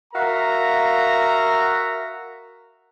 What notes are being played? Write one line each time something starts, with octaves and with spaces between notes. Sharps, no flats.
F#4 A#4 E5 F5 A#5